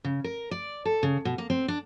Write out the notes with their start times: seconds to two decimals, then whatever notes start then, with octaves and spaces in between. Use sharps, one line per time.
0.04 C#3
0.24 A#4
0.51 D5
0.85 A4
1.03 C#3
1.25 B2
1.38 A#3
1.50 C4
1.68 D4